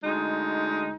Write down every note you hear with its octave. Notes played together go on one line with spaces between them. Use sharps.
D2 G#3 D#4